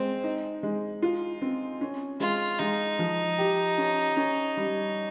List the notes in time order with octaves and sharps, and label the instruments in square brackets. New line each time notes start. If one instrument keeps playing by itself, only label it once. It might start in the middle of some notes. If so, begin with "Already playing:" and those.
Already playing: [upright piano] G#3 [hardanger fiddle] C4
[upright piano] D#4
G#3
F4
C4
C#4
[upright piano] G#3 [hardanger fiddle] F4
[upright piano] G#3 [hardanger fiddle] D#4
[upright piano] F3
G4
C#4
C#4
G3